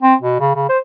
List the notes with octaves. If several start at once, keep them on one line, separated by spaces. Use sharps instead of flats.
C4
B2
C#3
C#3
C5